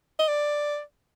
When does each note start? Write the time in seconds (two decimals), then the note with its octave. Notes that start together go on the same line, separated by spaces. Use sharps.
0.19 D#5
0.28 D5